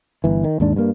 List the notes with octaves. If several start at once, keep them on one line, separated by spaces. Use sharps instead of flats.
G1 E3
D#3
D#2 G#2 D4
G2 A#3